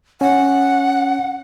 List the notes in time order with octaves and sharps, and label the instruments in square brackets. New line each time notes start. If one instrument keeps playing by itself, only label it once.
[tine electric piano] C#4 [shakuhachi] F#5